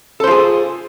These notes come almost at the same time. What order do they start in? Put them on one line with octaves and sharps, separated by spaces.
A4 C5 F4 G#4